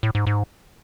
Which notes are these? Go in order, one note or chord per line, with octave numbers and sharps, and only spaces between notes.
A2
G#2
G#2